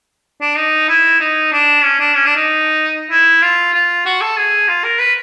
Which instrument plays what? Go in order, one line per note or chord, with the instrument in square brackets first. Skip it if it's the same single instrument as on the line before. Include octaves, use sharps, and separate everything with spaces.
[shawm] D4
D#4
E4
D#4
D4
C#4
D4
C#4
D4
D#4
E4
F4
F4
F#4
A4
G#4
F4
A#4
B4